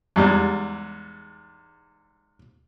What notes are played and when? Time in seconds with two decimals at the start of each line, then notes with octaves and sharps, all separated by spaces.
0.16 E2 G#2 G3